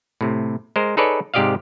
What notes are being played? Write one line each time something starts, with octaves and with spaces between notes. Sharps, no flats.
A2 C3
G#3 A#4 C5
D#4 G#4 A4 B4 C#5 D5
G#2 C3 G4 D5 D#5 F5